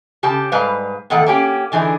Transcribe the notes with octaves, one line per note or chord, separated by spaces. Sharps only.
C#3 G4 A5
G#2 G3 B4 F5
E2 A2 D#3 A4 F#5
A#3 C#4 G4
D3 E3 D#4 G#4